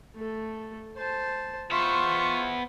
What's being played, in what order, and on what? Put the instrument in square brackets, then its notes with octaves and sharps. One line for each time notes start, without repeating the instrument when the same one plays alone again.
[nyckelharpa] A3 A4
C5 A5
[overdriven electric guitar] B3 E5 [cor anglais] F4 [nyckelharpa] B4 C5 [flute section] C6 C#6